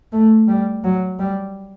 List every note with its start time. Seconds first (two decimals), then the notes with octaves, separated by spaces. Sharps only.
0.12 A3
0.48 G3
0.84 F#3
1.19 G3